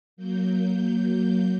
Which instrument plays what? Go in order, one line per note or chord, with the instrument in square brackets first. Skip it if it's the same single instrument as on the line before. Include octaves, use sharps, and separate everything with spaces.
[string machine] F#3 A#3 G6